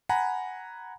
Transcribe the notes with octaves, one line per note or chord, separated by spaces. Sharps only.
F#5 G#5 A#5 B5